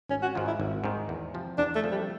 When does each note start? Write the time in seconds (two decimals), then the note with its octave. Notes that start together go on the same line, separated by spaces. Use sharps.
0.09 G#1 C#4
0.22 F#4
0.35 G#2 D#3 F4
0.47 E4
0.60 G#1
0.84 G#2 D#3
1.09 E2
1.34 C3 F3
1.58 E2 D4
1.75 A3
1.82 C3 F3
1.91 G3